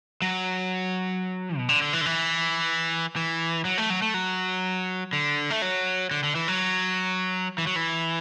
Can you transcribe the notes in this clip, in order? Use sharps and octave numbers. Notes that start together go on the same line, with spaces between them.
F#3
B2
D3
D3
E3
D3
E3
E3
F#3
A3
F#3
A3
F#3
D3
A3
F#3
D3
D3
E3
F#3
E3
F#3
E3